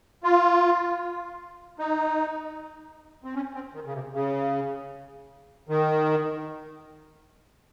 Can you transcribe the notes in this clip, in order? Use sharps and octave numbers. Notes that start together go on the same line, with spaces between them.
F4
D#4
C4
C#4
C4
D#3
C#3
C3
C#3
D#3